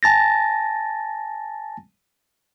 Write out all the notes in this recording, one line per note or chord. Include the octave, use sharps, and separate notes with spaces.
G#5 A5 A6 A#6